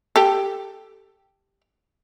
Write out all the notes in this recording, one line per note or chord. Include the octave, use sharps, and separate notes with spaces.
G4 A4